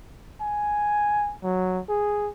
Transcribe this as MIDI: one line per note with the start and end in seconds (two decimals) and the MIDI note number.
0.41 1.33 80
1.44 1.80 54
1.89 2.29 68